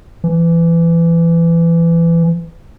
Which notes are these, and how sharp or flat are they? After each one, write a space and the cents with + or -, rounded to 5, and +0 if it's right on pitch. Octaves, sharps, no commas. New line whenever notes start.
E3 +25